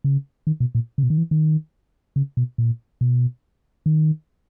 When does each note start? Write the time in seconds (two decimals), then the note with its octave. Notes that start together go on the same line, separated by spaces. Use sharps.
0.04 C#3
0.47 D#3
0.60 B2
0.75 A#2
0.98 C#3
1.03 B2
1.10 D#3
1.18 E3
1.31 D#3
2.16 C#3
2.37 B2
2.58 A#2
3.01 B2
3.86 D#3